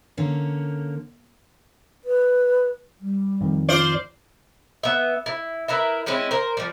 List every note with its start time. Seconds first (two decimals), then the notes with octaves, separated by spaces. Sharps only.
0.17 D3 A#3 C#4
2.05 B4
3.00 G3
3.41 F2 D#3
3.69 F4 C5 D5
4.83 B3 E5
5.26 E4
5.68 E4 A#4 B4 E5
6.06 G#3 C4 C#4 E4
6.31 A#4 C5
6.57 F3 G3